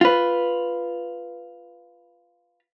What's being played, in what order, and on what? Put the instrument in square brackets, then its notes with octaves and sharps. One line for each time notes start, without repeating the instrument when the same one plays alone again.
[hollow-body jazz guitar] F4 B4